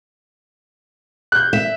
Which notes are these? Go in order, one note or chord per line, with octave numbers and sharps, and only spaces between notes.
F#6 G6
E5